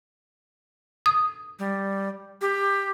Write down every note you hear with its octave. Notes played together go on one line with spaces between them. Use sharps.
D#6
G3
G4